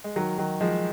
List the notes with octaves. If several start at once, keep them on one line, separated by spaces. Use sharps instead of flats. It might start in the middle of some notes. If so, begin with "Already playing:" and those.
G#3
D#3 F#3
D#3 F#3
F3 G#3